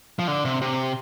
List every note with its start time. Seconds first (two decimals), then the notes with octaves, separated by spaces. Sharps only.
0.19 F3
0.28 D3
0.45 C3
0.62 C3